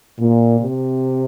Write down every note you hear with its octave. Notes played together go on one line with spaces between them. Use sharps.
A#2
C3